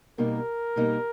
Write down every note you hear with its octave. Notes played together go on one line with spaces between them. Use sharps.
B2 G3 A#3 D#4 A#4
B2 G3 A#3 D#4